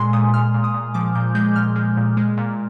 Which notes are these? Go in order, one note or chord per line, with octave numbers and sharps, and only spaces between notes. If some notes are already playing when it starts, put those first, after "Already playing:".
Already playing: A#2 G#3 G#5 C6
A#2 D#6
A#2 F6
A#2
D#6
A#2
F3 D6
A#2 G6
G#3 G6
A#2 F6
G#3
A#2
G#3
A#2